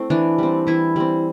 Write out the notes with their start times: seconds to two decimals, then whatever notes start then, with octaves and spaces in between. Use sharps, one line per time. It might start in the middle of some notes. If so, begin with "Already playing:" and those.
Already playing: A3 C4 E4
0.10 E3 D4
0.38 G3 C4
0.67 E3 E4
0.96 G3 C4